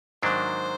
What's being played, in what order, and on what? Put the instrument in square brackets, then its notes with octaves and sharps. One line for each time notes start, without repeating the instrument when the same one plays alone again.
[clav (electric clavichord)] G#2 D#3 F#3 A#3 D4 [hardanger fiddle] C5